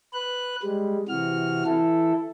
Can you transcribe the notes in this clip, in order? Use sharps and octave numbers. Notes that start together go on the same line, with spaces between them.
B4 F#6
G3 G#3
C3 E3 F#4 F6
E3 E4 A4